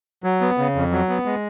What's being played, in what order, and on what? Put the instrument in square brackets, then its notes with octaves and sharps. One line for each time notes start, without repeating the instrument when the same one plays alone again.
[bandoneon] F#3
B3
C#3
F2
F#3
B3
G#3